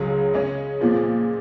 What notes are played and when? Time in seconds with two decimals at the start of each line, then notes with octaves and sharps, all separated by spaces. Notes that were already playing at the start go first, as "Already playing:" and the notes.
Already playing: C#2 C#3 F#3 C#4 G#4
0.33 C#3 G#3 C#4
0.81 A#2 F3 G#3